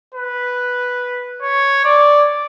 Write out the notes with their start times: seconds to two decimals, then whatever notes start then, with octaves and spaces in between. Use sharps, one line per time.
0.14 B4
1.42 C#5
1.84 D5